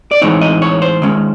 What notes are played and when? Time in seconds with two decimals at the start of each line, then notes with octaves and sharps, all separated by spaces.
0.11 D5
0.22 A2 E3 G#3 C4 D#4 C#5
0.41 D#5
0.62 C#5
0.82 C5
1.02 D#3 G#3 C#4